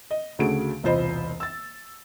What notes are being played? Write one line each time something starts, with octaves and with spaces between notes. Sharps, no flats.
D#5
D2 C#3 A3 F#4 G#4 D7
E1 C2 F4 C5 D#5 B5
E6 A6